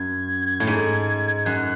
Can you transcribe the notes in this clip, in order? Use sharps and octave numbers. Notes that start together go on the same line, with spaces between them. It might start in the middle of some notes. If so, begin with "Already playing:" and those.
Already playing: F#2 G#6
A2
G#2
F#2 F#6